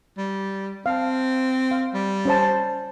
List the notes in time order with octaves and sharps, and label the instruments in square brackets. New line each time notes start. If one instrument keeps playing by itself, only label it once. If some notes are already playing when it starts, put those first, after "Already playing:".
[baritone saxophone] G3
[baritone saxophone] C4 [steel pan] F5 A5
[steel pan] F5
[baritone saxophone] G3
[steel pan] C#4 C5 A5